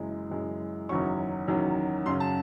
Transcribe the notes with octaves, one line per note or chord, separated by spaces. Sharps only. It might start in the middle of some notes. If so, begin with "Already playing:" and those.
Already playing: F#1 F#2 E3 G#3
F#1 F#2 E3 G#3
F#1 E2 D#3 F#3 C#4 C#6
F#1 E2 D#3 F#3 C#4
F#2 C#3 F#3 C#4 C6
A5